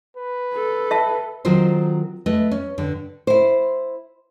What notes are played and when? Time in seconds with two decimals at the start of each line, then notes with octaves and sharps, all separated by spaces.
0.17 B4
0.53 A4
0.91 E5 F5 A5
1.45 D#3 F#3 C4 F4 A4 C5
2.26 A3 B4 D#5
2.51 C#4
2.78 G2 D3
3.27 E4 C5